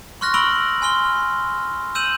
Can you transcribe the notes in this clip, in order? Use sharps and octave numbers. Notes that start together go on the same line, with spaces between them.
C6 C#6 F6 F#6 A#6
B5 C#6 E6 D7 F#7 G7
G#5 C6 F6 G7
E6 G6 D#7 E7 F#7